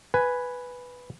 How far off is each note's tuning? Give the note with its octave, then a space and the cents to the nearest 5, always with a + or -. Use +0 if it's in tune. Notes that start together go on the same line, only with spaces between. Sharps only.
B4 +0 G#5 +0